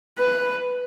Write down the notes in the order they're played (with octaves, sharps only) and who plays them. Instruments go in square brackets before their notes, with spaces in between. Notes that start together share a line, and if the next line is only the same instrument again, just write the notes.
[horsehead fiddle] B4